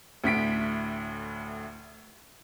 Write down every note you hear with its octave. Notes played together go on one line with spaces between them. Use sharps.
D2 A2 B6 D7